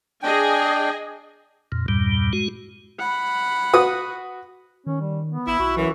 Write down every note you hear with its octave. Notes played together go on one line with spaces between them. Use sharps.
D4 G#4 D#5 G5 G#5
F2 A#2
E2 G2 A#2 G3
G#3 F#4
F#5 B5
F#4 B4 D#6
D#3 C#4
G3
B3
A1 E4
B1 F#4
F#2 E3